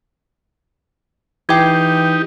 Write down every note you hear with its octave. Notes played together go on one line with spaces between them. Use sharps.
E3 D#4 G4 G5 D6 G#6